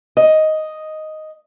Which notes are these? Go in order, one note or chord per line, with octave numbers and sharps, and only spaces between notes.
D#5